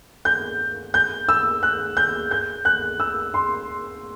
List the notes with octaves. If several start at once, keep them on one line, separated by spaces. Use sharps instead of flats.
G6
G6
E6
F#6
G6
G6
F#6
E6
C6